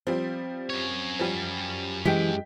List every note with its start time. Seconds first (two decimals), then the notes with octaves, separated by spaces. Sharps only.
0.07 F3 G3 C4
0.70 F#2 C#5
1.19 F3 G3
2.05 E3 G#3 E4 G4 G5 B6